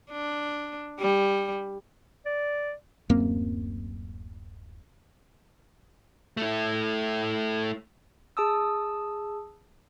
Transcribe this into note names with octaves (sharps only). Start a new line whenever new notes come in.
D4
G3
D5
D1 F#2 A#3 C4
A3 E4
G#4 A5 D#6 E6